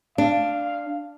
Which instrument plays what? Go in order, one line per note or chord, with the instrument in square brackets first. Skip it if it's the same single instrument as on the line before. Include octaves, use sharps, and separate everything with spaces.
[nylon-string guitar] D4 [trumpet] F5